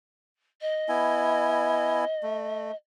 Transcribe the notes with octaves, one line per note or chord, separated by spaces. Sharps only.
D#5
B3 E4 G#5
A3